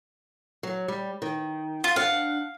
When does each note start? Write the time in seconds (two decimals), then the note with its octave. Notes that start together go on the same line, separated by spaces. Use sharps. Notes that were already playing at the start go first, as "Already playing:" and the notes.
0.63 F#3
0.88 G3
1.22 D#3
1.84 F4
1.96 D4 F5 F#5